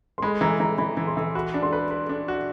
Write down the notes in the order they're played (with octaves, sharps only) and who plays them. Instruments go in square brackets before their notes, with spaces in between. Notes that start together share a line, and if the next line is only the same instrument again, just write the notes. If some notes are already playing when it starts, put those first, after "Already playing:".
[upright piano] C6
[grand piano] G#3 [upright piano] B5
[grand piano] E3 [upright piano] A#5
[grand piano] E3 [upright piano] A#5
[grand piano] E3 [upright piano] B5
[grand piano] E3
[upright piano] C6
[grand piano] E3
[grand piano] F#4 [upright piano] B5
[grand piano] D4
[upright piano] C6
[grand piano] B4
B4
D4
F#4